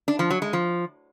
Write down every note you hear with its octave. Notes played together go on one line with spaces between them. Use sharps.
D4
F3
F#3
G#3
F3